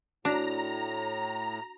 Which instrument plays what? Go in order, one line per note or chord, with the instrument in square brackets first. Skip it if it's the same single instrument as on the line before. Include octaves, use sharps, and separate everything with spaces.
[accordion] A2 [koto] D4 [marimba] F#4 [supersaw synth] A#5